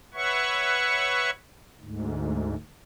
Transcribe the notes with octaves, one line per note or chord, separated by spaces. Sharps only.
B4 C#5 E5 F#5 C#6
D2 G#2